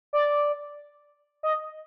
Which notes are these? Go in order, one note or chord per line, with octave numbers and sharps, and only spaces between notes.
D5
D#5